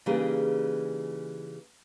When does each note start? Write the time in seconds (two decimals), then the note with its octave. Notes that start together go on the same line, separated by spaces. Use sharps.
0.06 C#3 E3 G3 A#3 D#4 G#4